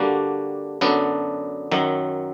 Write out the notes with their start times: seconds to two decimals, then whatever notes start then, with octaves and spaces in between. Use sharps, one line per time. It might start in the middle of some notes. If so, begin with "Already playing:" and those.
Already playing: D3 G3 A#3 D4 F#4
0.81 F#2 D3 F#3 B3 D4
1.72 F#2 D#3 F#3